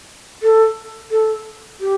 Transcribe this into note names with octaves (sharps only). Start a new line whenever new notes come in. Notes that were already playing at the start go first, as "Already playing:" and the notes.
A4
A4
G4